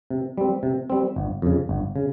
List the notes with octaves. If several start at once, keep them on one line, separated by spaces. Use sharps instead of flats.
C3
G3 C4
C3
G3 C4
G1
F2 C#3
G1
C#3